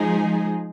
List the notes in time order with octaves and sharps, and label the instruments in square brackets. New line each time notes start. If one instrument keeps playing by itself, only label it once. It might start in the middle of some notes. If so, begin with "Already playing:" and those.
Already playing: [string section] F3 G#3 D#4 G#4